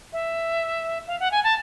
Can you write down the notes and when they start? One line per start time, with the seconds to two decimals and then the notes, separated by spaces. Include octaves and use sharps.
0.13 E5
1.07 F5
1.20 F#5
1.32 G#5
1.44 A5